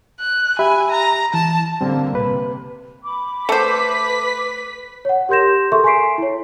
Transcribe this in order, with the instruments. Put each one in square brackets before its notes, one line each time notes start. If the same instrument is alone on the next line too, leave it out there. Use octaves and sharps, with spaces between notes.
[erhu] F#6
[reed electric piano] G4 E5 B5 [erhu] G#5
[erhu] A#5
[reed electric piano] E3 [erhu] A5
[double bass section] D3 A#3 [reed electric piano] G3 C4
[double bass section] C3 [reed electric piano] B4
[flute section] B5 D6
[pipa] A3 C5 [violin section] B4 B6
[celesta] C#5 F#5
G4 A#4 C6 G6 A#6 E7
G#4 A4 E5 C6 C#6
G#5 C6 C#6 B6 C7 D7
E4 C#5